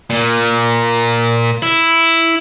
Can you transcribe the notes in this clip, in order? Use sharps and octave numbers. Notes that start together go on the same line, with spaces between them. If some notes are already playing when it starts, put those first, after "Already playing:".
A#2
E4